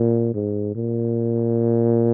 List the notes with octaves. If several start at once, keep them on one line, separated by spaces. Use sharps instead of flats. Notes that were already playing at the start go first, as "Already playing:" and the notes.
Already playing: A#2
G#2
A#2